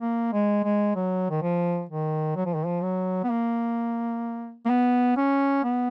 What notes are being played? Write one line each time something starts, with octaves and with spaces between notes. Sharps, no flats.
A#3
G#3
G#3
F#3
D#3
F3
D#3
F#3
F3
D#3
F3
F#3
B3
A#3
A#3
B3
C#4
B3